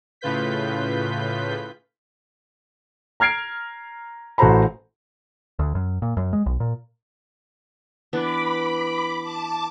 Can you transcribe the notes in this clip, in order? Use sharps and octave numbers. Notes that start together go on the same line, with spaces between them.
A2 C#3 F4 B4 G6 B6
A#5 F6 G#6 C7 D7
A1 F#4 A4 C5 A#5 B5
D2
F#2
A#2
F#2
G#3
B1
A#2
E3 B3 D4 B5 D6
A5 D6